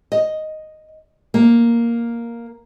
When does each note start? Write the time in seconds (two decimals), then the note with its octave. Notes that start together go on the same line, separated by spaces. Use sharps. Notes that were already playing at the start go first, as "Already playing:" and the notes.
0.12 D#5
1.34 A#3